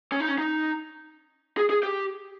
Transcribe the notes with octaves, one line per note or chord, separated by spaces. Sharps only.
C#4
D#4
C#4
D#4
G#4
G#4
G4